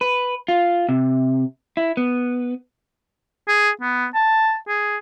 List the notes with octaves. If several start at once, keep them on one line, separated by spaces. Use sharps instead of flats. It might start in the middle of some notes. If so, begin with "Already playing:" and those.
B4
F4
C3
E4
B3
G#4
B3
A5
G#4